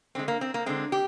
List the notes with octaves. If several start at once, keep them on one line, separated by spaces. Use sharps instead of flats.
D3 G#3 C4
A#3
C4
A#3
D3 G#3 C4
G4